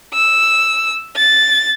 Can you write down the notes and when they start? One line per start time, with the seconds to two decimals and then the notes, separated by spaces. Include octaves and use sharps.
0.14 E6
1.16 A6